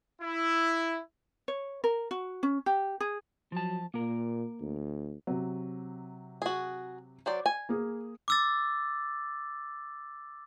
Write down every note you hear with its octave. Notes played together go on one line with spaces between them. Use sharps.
E4
C#5
A#4
F#4
C#4
G4
G#4
F3 F#3 A5
A#2 A#3 A#4
D2
C3 F#3
F#4 G#4
F#3 C5 D5
G#5
A#3 G#4
D6 E6 A6